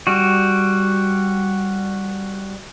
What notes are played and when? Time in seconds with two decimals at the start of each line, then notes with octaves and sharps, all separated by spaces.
0.07 G3 F#4